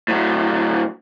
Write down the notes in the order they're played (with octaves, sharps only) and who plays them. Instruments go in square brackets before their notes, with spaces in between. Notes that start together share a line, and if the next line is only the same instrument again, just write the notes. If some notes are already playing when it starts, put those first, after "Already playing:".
[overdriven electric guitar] A2 F#3